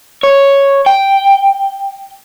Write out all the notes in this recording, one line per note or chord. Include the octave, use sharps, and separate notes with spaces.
C#5
G5